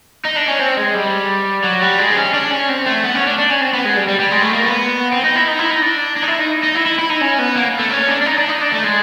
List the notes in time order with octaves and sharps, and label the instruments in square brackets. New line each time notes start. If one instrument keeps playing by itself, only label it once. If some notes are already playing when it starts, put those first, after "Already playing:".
[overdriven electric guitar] D#4
D4
C#4
C4
G#3
G3
F#3
G3
G#3
C4
C#4
D4
C#4
C4
A3
B3
C#4
D4
D4
C#4
C4
B3
G#3
G3
G3
G3
G#3
A3
A#3
B3
C4
D#4
E4
D#4
E4
D#4
D4
D4
D#4
E4
D#4
D#4
E4
E4
E4
D#4
C#4
B3
A#3
A3
C#4
D4
D4
D#4
D4
D#4
D4
A3
G#3